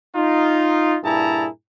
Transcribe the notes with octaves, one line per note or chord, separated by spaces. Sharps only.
D#4 F4
G2 A#2 E4 G#4 A5 A#5